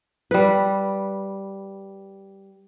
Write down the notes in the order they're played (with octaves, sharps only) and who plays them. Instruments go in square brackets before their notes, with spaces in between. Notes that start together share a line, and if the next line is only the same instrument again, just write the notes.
[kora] G3 B4